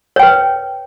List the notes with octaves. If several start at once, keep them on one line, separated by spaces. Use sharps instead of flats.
B4 C#5 G5